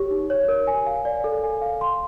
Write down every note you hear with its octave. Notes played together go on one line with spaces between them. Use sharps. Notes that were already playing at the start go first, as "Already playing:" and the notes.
Already playing: G4 A#4 C#5
D#4
C#5
A#4
G#5
F5
D5
A4
G#5
F5
C6